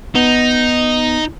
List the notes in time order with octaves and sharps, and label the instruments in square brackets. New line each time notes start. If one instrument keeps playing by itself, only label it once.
[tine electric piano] B3 [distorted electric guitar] D#4